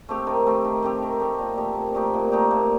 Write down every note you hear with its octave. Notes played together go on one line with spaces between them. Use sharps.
A3 C4 G4
D#3
A3 C4 G4
D#3
A3 C4 G4
D#3
A3 C4 G4
A#2
A3 D#4 G4
A#2
A3 D#4 G4
A#2
A3 D#4 G4
A#2